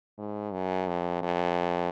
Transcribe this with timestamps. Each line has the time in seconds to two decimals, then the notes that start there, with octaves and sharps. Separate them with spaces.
0.18 G#2
0.53 F#2
0.88 F2
1.22 F2